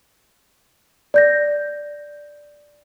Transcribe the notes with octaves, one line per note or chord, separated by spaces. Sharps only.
D5 G6 A#6